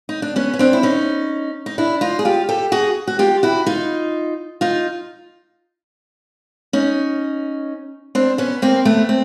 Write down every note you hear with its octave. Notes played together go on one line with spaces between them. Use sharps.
D#4
D4
B3 C#4
C#4
C4 D4
E4
C#4 D#4
D#4
D4 E4
D#4 F4
G#4
F4 G4
G4 A4
F#4 G#4
F#4
F4 G4
E4 F#4
D#4 F4
D#4 F4
C#4 D#4
C4 D4
B3 C#4
A#3 C4
A3 B3
C4